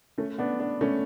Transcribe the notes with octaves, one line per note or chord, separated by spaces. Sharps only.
A3 C#4
B3 D4
B3 D4
A3 C#4